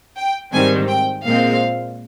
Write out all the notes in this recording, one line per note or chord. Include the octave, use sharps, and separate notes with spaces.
G5
G#2 D#3 G3 C4 G#5
G5
A#2 G#3 C4 F5